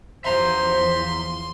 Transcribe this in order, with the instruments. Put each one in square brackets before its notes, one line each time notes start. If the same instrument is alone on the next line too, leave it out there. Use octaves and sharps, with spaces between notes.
[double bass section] E2 F3 [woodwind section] C5 [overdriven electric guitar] E5 A#5 [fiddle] C6